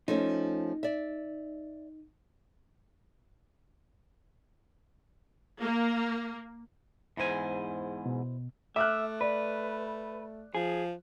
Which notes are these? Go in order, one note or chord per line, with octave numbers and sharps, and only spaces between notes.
F3 A3 C#4 D#4
D5 E5
A#3
E2 G#2 E4 C5 G#5
B2
A3 E5 D6 F6 F#6
B4 D5
F3 G#4